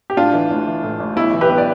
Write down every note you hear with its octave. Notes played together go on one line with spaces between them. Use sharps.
G4
A2 D4 F4
E3
A1
E3
A2
A1
B1 E4
E3
G4 B4
B1
D5